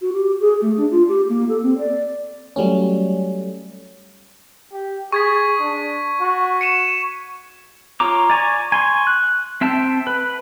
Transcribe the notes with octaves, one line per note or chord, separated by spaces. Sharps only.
F#4
G4
G#4
A3
D4
F4
G4
A#3
A4
C4
D5
F#3 G3 A3 C#4
G4
G#4 C#6 G#6 B6
D4
F#4
C#7 D#7 E7
F4 C#5 A#5 D6
D5 G#5 A#5 C#6
G#5 C6 C#6
F#6
C4 E5 G5 A5
B4